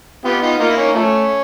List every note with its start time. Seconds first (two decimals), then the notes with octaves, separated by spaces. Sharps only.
0.24 B3 F4 G4
0.42 D#4 F4
0.59 A#3 D#4 F4
0.69 E4
0.77 C#4 D#4
0.93 F3 A3 C#4